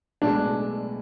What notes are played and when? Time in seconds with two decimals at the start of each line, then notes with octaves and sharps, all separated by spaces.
0.22 B1 A2 G#3 B3 D4